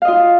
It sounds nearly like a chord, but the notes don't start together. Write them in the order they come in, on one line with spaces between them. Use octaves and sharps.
F5 D#5 F4